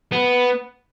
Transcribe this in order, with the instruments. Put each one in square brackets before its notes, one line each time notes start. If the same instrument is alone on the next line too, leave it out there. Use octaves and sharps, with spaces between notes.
[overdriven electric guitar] B3